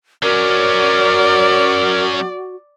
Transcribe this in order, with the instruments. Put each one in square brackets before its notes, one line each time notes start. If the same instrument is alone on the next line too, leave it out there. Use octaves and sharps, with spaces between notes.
[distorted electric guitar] F#3 C#4 [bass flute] F#4 [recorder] A#4 [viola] D5